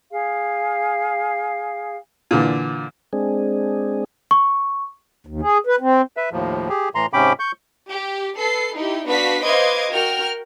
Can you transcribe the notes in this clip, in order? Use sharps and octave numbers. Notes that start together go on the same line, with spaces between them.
G#4 F5
A#2 D3 E3
G#3 C4 D4 G#4
C#6
D#2
G#4
B4
C4
B4 E5
D#2 A2 F3
G4 G#4
A2 E3 A#5 C6
G#2 C3 C#4 G5 B5 D6
C#6 G6
G4
A4 B4 C7
D#4 E4 G4
B3 D4 F#4 B4 F5 B6
B4 C5 D#5 F5 D6 G#6
F#4 A#4 G5 F6